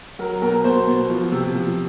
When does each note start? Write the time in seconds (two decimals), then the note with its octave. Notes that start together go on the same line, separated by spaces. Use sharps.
0.19 F#3 A#4
0.42 B2 A#4
0.64 B2 C5
0.87 B2
1.10 F3
1.32 C3
1.55 F3